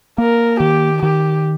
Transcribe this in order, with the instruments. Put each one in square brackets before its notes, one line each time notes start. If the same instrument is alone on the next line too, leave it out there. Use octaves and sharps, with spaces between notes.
[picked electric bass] A#3 [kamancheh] A#4
[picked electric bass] D#3 [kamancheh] G4
[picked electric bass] D#3 [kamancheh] G4